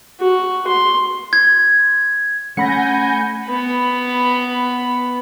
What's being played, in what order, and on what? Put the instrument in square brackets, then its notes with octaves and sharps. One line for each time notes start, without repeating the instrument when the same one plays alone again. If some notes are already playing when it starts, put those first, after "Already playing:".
[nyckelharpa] F#4
C6
[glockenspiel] G#6
[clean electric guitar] A3 C#4 [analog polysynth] F#5 A#6 [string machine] G#5 G6 [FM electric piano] B5 C#7
[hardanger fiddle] B3 B5